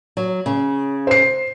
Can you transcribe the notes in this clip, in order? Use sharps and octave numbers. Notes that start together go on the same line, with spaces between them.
F#3
C#3
C5 C7